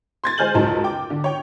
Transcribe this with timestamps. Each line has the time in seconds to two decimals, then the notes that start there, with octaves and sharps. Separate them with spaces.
0.24 C6 G#6 A6
0.38 G#3 C5 G#5 F6 G6 F#7
0.55 C#2 F#2 D#4 A5
0.84 G5 D6
1.10 D3
1.24 C#5 G5